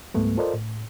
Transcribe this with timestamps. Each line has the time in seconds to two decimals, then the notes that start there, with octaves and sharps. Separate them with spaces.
0.14 C#2 G#2 G3 A3 B3
0.37 F4 A4 A#4 C5 D5 D#5
0.54 A2